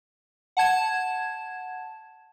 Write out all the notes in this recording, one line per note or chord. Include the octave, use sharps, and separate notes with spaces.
F#5 A5 G#6 E7